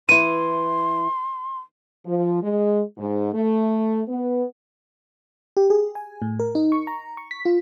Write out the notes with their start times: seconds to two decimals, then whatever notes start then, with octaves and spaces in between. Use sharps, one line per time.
0.09 E3 E4 C6 D#7
2.06 F3
2.42 G#3
2.98 G#2
3.33 A3
4.08 B3
5.57 G4
5.70 G#4
5.95 G#5
6.22 A2
6.39 A#4
6.55 D#4
6.72 C#6
6.87 A#5
7.17 C#6
7.31 B6
7.45 F4